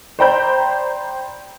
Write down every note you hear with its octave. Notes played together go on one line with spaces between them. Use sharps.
C5 D5 G5 A#5 B5 G6